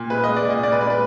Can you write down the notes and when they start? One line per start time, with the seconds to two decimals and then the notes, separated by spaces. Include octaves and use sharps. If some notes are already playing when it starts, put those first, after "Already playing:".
Already playing: A#2
0.10 G#3 B4
0.24 G#3 D#5
0.37 D5
0.45 A#2 D#5
0.63 A#2 D5
0.72 B4
0.81 G#3 D5
0.90 B4